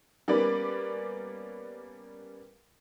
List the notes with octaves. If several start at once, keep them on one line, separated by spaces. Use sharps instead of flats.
G3 A#3 B3 C#4 B4 D5